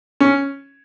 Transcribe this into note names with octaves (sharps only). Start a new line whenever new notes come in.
C#4